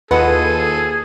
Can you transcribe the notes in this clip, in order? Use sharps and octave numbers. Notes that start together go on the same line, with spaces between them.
D#2 F4 G#4 A4 B4 D#5 F#5 D#7